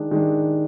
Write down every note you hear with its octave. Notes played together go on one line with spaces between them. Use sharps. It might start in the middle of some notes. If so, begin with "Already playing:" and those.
Already playing: D#3 G#3 D4
D#3 G#3 D4